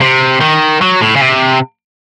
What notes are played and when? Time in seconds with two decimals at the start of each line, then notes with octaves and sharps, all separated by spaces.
0.01 C3
0.41 D#3
0.81 F#3
1.01 A2
1.16 C#3
1.21 C3